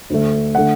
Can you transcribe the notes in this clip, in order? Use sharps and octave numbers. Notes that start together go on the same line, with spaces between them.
D2 D3 A3
D3 A3 F#5